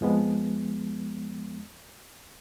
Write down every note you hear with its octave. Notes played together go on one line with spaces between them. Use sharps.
F2 F3 G#3 B3